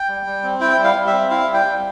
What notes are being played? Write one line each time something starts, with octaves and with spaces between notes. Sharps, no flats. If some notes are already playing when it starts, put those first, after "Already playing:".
Already playing: G5
G3
G3
C4
E4 G5
G3
F5
G3
E5
C4
E4 F5
G3
G5
G3